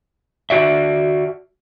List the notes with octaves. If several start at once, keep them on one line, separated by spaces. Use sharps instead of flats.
F#4 D5 E5